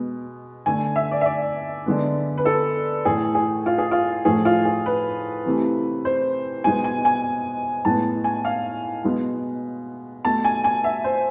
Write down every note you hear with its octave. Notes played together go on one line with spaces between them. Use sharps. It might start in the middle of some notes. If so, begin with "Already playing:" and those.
Already playing: B2 G#3 B3
D3 A3 G#5
E5
D5
E5
D5
D3 G#3 B3
B4
A4
A2 E3 A3 G#4
G#4
F4
G#4
F4
A2 F3 A3 G#4
F4
G#4
B4
C3 E3 A3
C5
B2 G#3 B3 G#5
G#5
G#5
A2 G#3 B3 A5
G#5
F5
B2 G#3 B3
B2 A3 A5
G#5
G#5
E5
C5